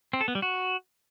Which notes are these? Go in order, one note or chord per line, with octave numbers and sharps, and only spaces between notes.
C4
A4
B3
G3
F#4